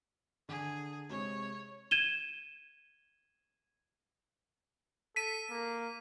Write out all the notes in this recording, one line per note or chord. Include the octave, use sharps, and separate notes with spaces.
D3 G#4
C3 G#3 C#5
G#6 D#7 E7 G7
A4 B6 D#7
A#3